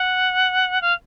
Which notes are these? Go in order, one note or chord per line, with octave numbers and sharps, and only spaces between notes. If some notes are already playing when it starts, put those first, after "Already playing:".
Already playing: F#5
F5